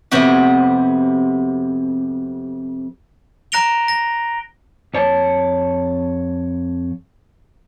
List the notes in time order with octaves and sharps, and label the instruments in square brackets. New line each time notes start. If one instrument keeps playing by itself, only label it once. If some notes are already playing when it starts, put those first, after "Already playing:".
[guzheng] F2 C3 B3 F#4 G4
[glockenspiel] A#5 F#6 A#6 D7 F7 G7
A#6
[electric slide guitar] F2 C#5 A5